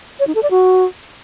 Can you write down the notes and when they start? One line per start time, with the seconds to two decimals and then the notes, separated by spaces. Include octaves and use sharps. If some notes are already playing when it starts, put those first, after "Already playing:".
0.19 C#5
0.27 D#4
0.35 A4
0.43 D5
0.51 F#4